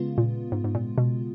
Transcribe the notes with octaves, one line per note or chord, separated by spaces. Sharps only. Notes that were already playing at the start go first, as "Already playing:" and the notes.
Already playing: C#3 G#3 B3 F4
A#2
G#2
G#2
A#2
B2